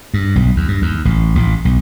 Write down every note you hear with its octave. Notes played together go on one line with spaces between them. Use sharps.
G2
B1
D#2
G2
D#2
A1
A1
B1